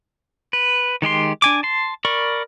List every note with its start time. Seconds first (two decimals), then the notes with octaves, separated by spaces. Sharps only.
0.53 B4
1.02 D#3 G#3 G4 C6
1.42 D4 G#5 D6
1.63 A5 C6
2.05 A#4 D5 B5 C#6